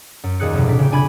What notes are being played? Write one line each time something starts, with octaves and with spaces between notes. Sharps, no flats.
F#2
D#2 A#2 G#4 F#6 C#7
F1 B2
A2 D4 B6
C#3 G4
D4 G#5 B5 G#6